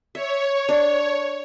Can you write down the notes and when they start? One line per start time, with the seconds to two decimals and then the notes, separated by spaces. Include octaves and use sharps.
0.15 C#5 E5
0.69 D4